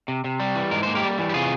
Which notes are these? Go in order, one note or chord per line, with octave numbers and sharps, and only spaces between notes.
C3
C3
G3
E3
G#2 A#4
A#3 C5
G4 A#4
G3
E3
G4
C3 F4 G#4